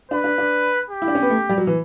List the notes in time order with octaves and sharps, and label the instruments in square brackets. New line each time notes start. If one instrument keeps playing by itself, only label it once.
[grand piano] D4 [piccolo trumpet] B4
[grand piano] D4
D4
[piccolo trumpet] G4
[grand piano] E4
D4
C#4
B3
A3
G3
F#3
E3